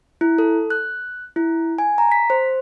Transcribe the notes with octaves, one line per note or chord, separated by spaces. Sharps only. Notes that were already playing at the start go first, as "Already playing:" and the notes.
E4
A4
F#6
E4
G#5
A#5
B6
C5